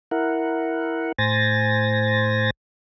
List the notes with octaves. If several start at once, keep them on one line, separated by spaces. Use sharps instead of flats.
E4 A#4 F#5
A2 C5 G#5 A6 A#6